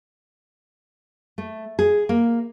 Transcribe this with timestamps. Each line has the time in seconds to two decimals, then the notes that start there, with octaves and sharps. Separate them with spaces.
1.38 A3
1.79 G#4
2.09 A#3